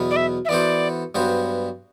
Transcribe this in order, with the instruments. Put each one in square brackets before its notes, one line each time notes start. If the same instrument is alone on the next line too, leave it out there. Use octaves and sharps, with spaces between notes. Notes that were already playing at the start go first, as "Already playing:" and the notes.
Already playing: [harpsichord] E2 B2 F#3 B3
[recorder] D5
E5
E5
[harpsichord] E3 B3 F#4 A4 C5 [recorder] D5
[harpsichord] G2 F#3 B3 F#4 C5